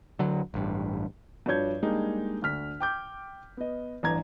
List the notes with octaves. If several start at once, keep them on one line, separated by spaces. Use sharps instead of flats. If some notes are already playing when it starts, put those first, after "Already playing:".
D3 F#3
A1 G2
G2 F3 F#4 C#5 G6 G#6
G3 G#3 A#3 D4 D#4
D2 D3 F6 B6
G5 D6 G6
B3 D#5
A1 G2 A#5 G#6